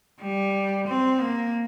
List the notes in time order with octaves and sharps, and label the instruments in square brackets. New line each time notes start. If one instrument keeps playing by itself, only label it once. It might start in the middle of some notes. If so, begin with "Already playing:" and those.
[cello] G3
C4
A#3